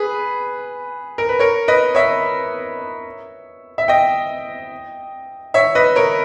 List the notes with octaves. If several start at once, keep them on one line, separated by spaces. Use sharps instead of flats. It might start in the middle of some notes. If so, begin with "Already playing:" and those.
Already playing: G#4 B4
A#4
B4
A#4 C#5
B4 D#5
C#5 E5
E5
D#5 G5
C#5 E5
B4 D#5
A#4 C#5